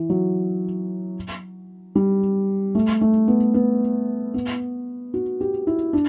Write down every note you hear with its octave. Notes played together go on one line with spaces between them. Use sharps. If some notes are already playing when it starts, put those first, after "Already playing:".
Already playing: E3
F#3
G3
A3
A3
B3
B3
B3
F#4
G4
E4
D4